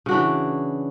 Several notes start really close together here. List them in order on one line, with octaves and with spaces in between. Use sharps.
C#3 F#4 D4 E3